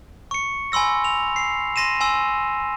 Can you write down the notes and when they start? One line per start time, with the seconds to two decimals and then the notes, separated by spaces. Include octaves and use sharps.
0.31 C#6 C#7
0.72 G#5 B5 C6 E6 A#6
1.04 F7
1.36 C7
1.76 C6 A#6 D#7 E7
2.01 G#5 C6 E6